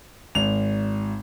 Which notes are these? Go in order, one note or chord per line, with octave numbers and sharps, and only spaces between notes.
G#1 F7